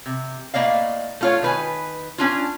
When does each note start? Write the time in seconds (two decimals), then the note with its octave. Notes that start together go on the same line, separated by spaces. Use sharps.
0.06 C3
0.54 A2 A3 A#3 D5 D#5 F5
1.21 A3 F4 C#5
1.42 D#3 B4 G#5
2.18 C#4 D4 F4